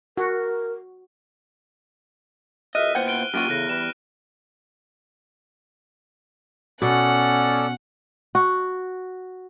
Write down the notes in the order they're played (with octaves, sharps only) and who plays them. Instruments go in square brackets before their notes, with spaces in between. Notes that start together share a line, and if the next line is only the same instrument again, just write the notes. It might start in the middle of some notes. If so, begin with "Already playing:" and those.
[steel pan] F#4 [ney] A#4
[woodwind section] C#2 F#2 E5 [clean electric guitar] D#5 [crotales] F6 F#6 D#7
[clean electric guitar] A#2 F#5 G5 [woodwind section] B3 E4 C5
[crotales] F6 D7 G7
[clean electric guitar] F#2 A#2 F#4 [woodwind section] G4 [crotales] F6 D7 D#7
[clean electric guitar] E2 [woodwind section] A2 C#3 [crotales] F#6 A#6
[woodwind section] E3 G3 B4 [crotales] E7
[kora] B2 [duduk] C#4 [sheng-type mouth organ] A4 D5 [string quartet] F#5
[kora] F#4